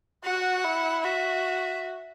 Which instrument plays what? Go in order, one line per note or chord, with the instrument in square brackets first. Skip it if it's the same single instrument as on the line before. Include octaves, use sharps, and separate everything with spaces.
[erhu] F#4 [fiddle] F#5
[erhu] E4
[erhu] F#4 [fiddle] E5